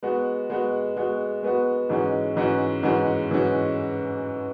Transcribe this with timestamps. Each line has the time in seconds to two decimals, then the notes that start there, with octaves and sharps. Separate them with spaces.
0.03 G#3 B3 F#4
0.50 G#3 B3 F#4
0.97 G#3 B3 F#4
1.43 G#3 B3 F#4
1.89 G#2 E3 G#3 C#4 F#4
2.36 G#2 E3 G#3 C#4 F#4
2.83 G#2 E3 G#3 C#4 F#4
3.30 G#2 E3 G#3 C#4 F#4